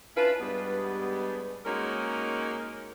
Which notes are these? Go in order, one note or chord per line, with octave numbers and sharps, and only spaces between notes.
C#4 D4 E4 F4 B4
G2 G3 G#3 B3
G#3 A#3 C#4 D#4 F#4 A#4